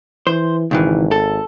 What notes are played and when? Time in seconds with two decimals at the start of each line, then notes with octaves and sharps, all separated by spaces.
0.27 E3 C5
0.71 G#1 C#2 D#3 E3
1.11 A4